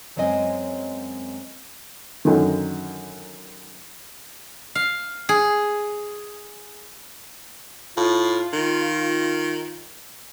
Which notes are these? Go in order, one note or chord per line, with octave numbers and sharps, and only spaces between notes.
F#2 F#3 G#3 C4 D#5 G#5
F#2 D3 D#3
F5
G#4
A2 F4
D#3